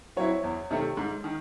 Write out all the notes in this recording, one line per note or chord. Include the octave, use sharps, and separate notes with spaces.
F#3 C4 E4 C#5
E2
C3 D#3 A3
G#2
D#3